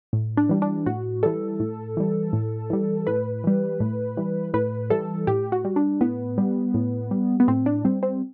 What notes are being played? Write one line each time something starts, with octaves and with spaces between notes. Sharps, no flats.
A2
D4
E3 G3
D4
A2 F#4
E3 G3 A4
A2
E3 G3
A2
E3 G3
A2 B4
E3 G3
A2
E3 G3
A2 B4
E3 G3 A4
A2 G4
F#4
G3
D4
A2 B3
G3
A2
G3
B3
A2 C4
D4
G3 C4
C4